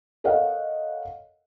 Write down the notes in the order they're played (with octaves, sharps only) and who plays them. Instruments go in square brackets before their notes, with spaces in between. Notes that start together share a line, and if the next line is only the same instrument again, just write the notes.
[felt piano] A4 A#4 C#5 D#5 F5 F#5